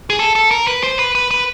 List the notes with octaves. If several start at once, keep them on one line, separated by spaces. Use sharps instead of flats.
G#4
A4
A4
A#4
B4
C5
B4
B4
B4